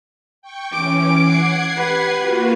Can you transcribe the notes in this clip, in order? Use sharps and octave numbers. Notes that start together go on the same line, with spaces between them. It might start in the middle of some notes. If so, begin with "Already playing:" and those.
G5 C#6
E3 C#4 D6 D7
F#5 G#6 C7
G4 B4
A#3 F4 F#4